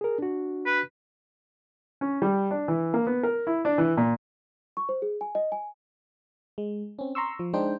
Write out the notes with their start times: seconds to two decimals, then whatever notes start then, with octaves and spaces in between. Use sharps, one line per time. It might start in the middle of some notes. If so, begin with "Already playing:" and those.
0.01 G#4 A#4
0.19 D4 F#4
0.66 B4
2.01 C#4
2.22 G3
2.51 D4
2.68 E3
2.94 A#3
3.07 B3
3.23 A#4
3.47 E4
3.65 D4
3.78 E3
3.97 A#2
4.77 C#6
4.89 C5
5.02 G#4
5.21 G#5
5.35 D#5
5.52 G#5
6.58 G#3
6.99 C4 C#4
7.15 A#5 C6 C#6 E6
7.39 F3
7.53 G#3 D4 D#4 C5 G5